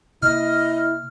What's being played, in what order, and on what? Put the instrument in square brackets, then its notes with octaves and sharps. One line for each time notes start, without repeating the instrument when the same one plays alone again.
[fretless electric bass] C3 A#3 [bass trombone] E4 [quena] D#5 [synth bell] F6